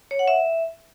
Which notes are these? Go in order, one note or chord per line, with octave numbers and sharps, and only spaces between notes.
C#5
F#5
E5